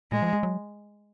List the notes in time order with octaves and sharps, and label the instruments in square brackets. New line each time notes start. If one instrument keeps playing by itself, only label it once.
[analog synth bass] A#2 [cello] G#3
[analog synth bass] F3
G#3
F#3